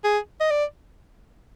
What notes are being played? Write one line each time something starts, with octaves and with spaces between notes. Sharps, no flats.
G#4
D#5
D5